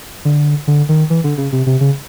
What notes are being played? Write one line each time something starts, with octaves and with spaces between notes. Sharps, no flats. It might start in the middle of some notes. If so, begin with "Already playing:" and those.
D3
D3
D#3
E3
D3
C#3
C3
C3
C#3